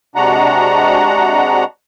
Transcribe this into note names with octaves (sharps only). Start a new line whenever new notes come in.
C3 G#3 D4 F#4 F#5 A#5